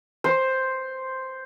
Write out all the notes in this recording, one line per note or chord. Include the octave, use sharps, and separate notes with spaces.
C5